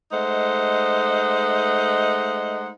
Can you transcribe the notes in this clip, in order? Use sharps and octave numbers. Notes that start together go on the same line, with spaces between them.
G#3 A3 D#4 C5 F#5